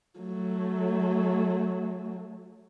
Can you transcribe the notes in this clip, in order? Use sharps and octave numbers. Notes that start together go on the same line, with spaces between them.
F#3 A3